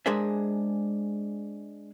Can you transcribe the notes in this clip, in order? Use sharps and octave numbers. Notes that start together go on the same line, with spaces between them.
G#3 D4 G#4 A#4 C5 E5